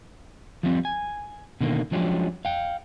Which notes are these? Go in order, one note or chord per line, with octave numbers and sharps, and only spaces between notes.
F3 G3 C4
G#5
B2 D3 D#3 A#3
F3 F#3 G#3 C#4 D4 G4
F5 G5